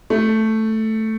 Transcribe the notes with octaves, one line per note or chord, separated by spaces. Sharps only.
A3